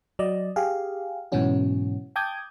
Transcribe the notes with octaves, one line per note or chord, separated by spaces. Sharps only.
F#3 D5 D#5
G4 G#4 F5
G#2 B2 E3 F#3 C#4 F#4
G5 A5 D6 D#6 G6 G#6